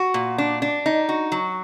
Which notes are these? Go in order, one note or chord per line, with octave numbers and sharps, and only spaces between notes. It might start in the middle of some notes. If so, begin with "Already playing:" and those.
Already playing: F#4
A#2
D4
D4
D#4
F#4
F#3